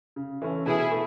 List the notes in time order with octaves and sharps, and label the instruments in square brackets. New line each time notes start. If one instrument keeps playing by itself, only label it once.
[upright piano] C#3
E3 A3 C#4
[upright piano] B2 [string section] E4 G#4
[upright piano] A3